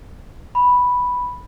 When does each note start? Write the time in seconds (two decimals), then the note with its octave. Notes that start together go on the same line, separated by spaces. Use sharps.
0.55 B5